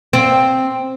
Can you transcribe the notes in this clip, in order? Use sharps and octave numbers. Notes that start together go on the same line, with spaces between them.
C4